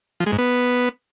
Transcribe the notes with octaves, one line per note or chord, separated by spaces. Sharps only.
F3
G#3
G#2
B3